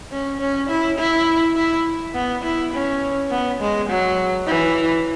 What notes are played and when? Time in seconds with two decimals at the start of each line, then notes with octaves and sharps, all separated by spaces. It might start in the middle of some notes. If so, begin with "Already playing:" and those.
0.11 C#4
0.40 C#4
0.69 E4
0.98 E4
1.56 E4
2.14 B3
2.44 E4
2.73 C#4
3.31 B3
3.61 G#3
3.89 F#3
4.47 E3